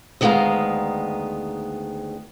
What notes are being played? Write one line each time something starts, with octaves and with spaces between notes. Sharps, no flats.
D2 D#3 G#3 B3 F5 A#5